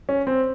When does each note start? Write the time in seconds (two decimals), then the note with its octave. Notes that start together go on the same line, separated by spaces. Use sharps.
0.09 C#4
0.27 C4